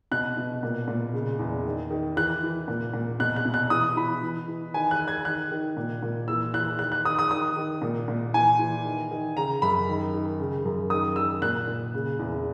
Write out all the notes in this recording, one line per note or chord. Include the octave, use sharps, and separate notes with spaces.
B2 F#6
B2
A#2
A#2
C#3
E2
D#3
D#3
E3 F#6
E3
A#2
A#2
B2 F#6
F#6
B2
F#6
E3 D#6
E3 B5
E3
E3
D#3 G#5
F#6
D#3
G#6
D#3 F#6
D#3
A#2
A#2
E3 E6
E3 F#6
D#3 F#6
F#6
D#3 D#6
D#6
D#3 D#6
D#3
A#2
A#2
E3 G#5
E3
D#3
D#3
C#3 A#5
F#2 B5
D#3
D#3
C#3
F#2
D#3 D#6
D#3 E6
A#2 F#6
A#2
C#3
E2